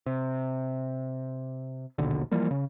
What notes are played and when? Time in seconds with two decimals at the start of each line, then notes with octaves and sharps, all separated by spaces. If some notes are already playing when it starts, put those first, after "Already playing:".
0.06 C3
1.98 A#1 D#2 B2 D3
2.32 E3 F3 G3 A#3
2.51 C#3